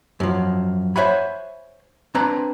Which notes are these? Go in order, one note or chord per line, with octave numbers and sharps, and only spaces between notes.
F#2 F3
C5 C#5 E5 F#5 G#5 B5
C4 D4 B4 C5 G#5 A#5